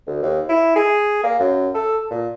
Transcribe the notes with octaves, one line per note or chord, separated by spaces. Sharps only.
D2
D#2
E4
G#4
A#3
F#2
A4
A#2